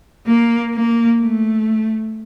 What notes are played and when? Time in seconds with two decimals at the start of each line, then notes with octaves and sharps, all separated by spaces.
0.27 A#3
0.74 A#3
1.22 A3